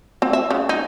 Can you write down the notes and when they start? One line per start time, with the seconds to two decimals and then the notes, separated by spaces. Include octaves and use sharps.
0.22 C4
0.33 E5
0.50 C#3
0.69 D#4